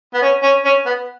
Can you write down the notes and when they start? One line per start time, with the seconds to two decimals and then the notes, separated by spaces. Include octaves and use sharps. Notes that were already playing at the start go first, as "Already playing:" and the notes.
0.14 B3
0.22 C#4
0.43 C#4
0.65 C#4
0.86 B3